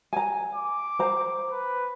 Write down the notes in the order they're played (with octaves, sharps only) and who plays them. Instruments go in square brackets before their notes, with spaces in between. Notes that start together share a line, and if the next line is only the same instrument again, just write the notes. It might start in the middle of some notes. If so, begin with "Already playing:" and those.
[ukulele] G#5 A#5
[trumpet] D6
[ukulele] C5 A#5
[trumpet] B4